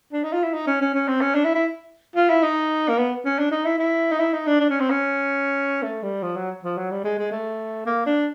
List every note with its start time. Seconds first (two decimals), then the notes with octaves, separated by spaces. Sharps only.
0.13 D4
0.24 D#4
0.33 F4
0.44 E4
0.54 D#4
0.67 C#4
0.81 C#4
0.94 C#4
1.08 C4
1.21 C#4
1.35 D4
1.45 E4
1.55 E4
2.16 F4
2.30 E4
2.43 D#4
2.89 A#3
2.98 B3
3.25 C#4
3.39 D4
3.52 D#4
3.66 E4
3.79 E4
4.12 D#4
4.20 E4
4.34 D#4
4.47 D4
4.61 D4
4.70 C#4
4.80 C4
4.90 C#4
5.83 A3
6.03 G3
6.23 F3
6.37 F#3
6.64 F3
6.78 F#3
6.91 G3
7.04 G#3
7.18 G#3
7.32 A3
7.86 A#3
8.06 D4